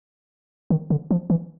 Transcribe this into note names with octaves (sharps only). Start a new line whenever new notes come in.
D#3
D3
F3
E3